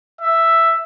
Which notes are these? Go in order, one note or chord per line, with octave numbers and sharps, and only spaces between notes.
E5